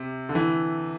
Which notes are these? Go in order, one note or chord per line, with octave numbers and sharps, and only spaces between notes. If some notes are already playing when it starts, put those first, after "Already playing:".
Already playing: C3
D3
E3